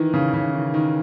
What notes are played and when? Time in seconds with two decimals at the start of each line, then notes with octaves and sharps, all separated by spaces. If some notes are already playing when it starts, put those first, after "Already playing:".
Already playing: D#3 E3
0.14 C#3
0.33 C#3
0.54 D#3
0.74 D#3